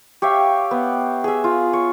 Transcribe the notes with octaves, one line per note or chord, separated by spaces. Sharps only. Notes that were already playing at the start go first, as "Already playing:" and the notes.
G4 C#5 E5 F5
B3
G#4 E5
F4
C#5